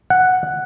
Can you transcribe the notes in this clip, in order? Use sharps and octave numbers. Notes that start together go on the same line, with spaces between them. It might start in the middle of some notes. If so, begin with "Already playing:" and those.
F#5